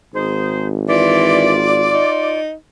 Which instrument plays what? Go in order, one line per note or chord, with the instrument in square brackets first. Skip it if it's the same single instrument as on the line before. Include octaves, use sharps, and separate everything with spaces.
[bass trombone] G#1 [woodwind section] D#4 G#4 C5
[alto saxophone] E3 [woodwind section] F4 D5
[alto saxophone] D#4